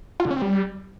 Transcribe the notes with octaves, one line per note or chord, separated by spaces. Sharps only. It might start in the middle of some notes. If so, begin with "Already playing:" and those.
F4
D3
C#4
C4
G3